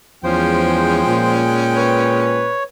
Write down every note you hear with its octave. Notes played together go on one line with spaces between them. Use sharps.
E2 F3 G#3 C#4 C5 G5
A#2
B4 C#5